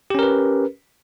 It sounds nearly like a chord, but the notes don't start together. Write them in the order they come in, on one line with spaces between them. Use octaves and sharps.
G4 C#4 A#4 B4